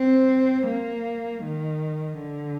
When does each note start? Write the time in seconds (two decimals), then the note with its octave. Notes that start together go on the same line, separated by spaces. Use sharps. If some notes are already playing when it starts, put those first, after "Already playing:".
Already playing: C4
0.68 A#3
1.43 D#3
2.18 D3